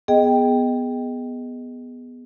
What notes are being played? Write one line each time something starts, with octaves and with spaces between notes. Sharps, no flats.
B3 G#4 D#5 G5